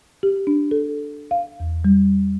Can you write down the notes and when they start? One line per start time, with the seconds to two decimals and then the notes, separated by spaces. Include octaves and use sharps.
0.23 G4
0.47 D4
0.71 A4
1.31 F5
1.60 E2
1.85 G3